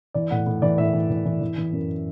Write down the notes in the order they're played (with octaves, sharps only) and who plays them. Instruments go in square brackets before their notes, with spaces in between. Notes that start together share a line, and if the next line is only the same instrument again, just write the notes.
[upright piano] E3 D5
A2 F#5
A2
E3 D5
A2 E5
E3
E3
E3
E3
E3
F#2